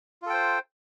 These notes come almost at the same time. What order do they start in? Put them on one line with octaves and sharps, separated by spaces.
F4 A4 G5 C5